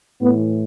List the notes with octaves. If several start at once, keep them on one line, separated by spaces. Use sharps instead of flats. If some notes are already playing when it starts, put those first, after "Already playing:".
A2 E3 B3